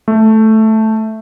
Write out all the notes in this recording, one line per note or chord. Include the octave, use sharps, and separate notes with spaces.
A3